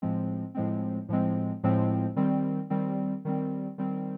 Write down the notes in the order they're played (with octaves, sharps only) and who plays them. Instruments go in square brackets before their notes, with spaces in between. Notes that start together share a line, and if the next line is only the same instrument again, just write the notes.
[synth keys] A2 F3 G#3 C4
A2 F3 G#3 C4
A2 F3 G#3 C4
A2 F3 G#3 C4
D#3 G3 C4
D#3 G3 C4
D#3 G3 C4
D#3 G3 C4